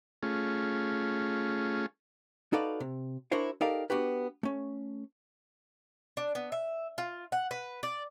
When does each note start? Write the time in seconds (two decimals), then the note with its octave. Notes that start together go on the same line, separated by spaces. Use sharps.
0.23 A3 C#4 F4 G#4
2.53 D#4 F#4 A4 B4 D5 F5
2.80 C3
3.31 D4 E4 F#4 A#4 C5 C#5
3.61 D#4 G4 A4 A#4 D5 F5
3.90 B3 D4 F#4 G4 B4
4.43 A3 C#4
6.17 D4
6.35 B3
6.52 E5
6.98 F4
7.32 F#5
7.51 B4
7.83 D5